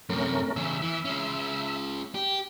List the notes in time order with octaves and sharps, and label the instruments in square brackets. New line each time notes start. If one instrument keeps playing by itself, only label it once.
[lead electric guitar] F#2 C3 [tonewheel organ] A3 C#4 A#4
[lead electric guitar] E2 C#3 [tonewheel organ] E5
[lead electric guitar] E3
G#3 C#4
G4